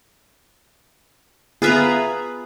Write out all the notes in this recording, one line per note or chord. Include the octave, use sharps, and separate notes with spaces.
B3 F4 G#4 B4 E5 A#5